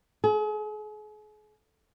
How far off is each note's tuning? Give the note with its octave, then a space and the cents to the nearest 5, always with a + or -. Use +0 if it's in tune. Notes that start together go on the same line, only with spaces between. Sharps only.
G#4 +40